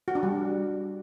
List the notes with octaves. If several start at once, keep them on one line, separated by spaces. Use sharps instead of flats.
F#4
D4
G3